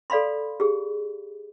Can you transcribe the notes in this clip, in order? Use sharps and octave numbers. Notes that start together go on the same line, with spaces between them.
A4 D5 F5 B5 C6
G4 G#4